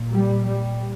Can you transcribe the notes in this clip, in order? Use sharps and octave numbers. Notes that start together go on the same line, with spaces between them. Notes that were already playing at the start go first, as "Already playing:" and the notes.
Already playing: A#2
G3
G3